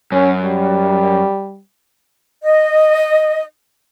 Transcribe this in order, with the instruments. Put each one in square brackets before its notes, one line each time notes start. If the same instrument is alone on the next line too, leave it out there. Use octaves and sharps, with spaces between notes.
[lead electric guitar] F#2 [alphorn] C#4
[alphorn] G3
[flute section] D#5